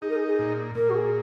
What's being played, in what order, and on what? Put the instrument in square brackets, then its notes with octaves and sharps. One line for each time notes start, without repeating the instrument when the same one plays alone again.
[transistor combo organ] D#4 [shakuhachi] G#4
[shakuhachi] A#4
G#4
G#4
[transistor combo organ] A#2
[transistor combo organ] A#2 [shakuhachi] A#4
[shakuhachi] F#4
G#4